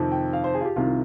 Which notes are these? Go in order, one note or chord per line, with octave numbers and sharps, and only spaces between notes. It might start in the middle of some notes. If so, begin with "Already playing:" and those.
Already playing: F2 C3 D#3
G5
F5
C5
G#4
F4
G4
C2 C3 D#3 F4